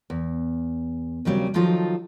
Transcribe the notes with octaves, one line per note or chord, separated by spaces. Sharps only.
E2
D#2 C#3 F#3 G3 B3 C4
D#3 F3 F#3 D#4 F4 A4